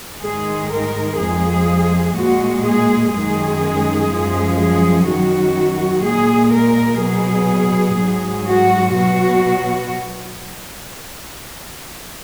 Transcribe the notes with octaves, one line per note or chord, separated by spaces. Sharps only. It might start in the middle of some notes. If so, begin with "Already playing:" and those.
G#2 D#3 G#3 G#4
A#4
F2 F3 G#3 G#4
A#2 G#3 F#4
G#4
F#2 D#3 G#3 G#4
F#2 F3 G#3
G#4
F#2 D#3 F#3 F#4
A#2 G#3 G#4
A#4
B2 F#3 G#4
G#2 F#3
F#4
B2 F#3 F#4